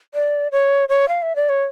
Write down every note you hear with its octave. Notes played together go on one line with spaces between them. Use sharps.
D5
C#5
C#5
F5
E5
D5
C#5